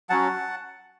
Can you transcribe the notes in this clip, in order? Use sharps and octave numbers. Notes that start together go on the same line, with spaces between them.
F#3 C#4 F#4 F#5 A5